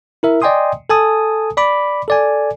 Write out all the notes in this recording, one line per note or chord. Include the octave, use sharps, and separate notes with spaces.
E4 A#4 E5
D5 D#5 G5 G#5 C6 D#6
A4 G#5 A5 D#6
D5 B5 D6
A4 D5 G#5